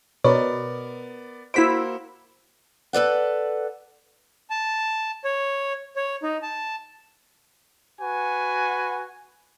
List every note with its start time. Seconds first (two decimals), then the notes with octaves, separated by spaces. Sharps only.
0.24 B2 B3 A#4 C#5 D5
1.54 A#3 E4 F#4 C5 B6 D7
2.93 A4 B4 D5 F#5
4.50 A5
5.25 C#5
5.96 C#5
6.23 D#4
6.42 A5
8.01 F#4 B4 G#5